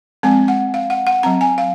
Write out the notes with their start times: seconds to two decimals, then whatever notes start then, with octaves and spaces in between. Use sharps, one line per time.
0.23 F3 G#3 C4 G#5
0.48 F#5
0.74 F5
0.90 F#5
1.07 F#5
1.23 F#3 C4 A#5
1.41 G#5
1.58 F5